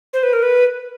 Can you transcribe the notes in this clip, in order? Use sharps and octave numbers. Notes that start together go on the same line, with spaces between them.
C5
B4
A#4
B4